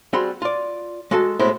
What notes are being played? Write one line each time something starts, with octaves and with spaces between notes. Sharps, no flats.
G3 C4 F#4 G#4 B5 C6
F4 D5
G#3 F#4 A4 G#5 A5
A2 G#3 B3 C4 E4 C5